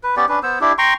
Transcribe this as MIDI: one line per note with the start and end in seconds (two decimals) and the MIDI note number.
0.03 0.15 71
0.16 0.25 59
0.16 0.25 61
0.16 0.25 67
0.16 0.25 74
0.29 0.39 61
0.29 0.39 62
0.29 0.39 71
0.43 0.59 59
0.43 0.59 72
0.43 0.59 88
0.61 0.73 62
0.61 0.73 64
0.61 0.73 67
0.78 0.94 79
0.78 0.94 82
0.78 0.94 84
0.78 0.94 85